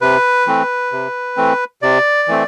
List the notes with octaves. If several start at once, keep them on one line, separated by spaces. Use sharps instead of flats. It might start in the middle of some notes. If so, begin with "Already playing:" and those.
C3 B4
E3 A3 C4
C3
E3 A3 C4
C3 D5
E3 A3 C4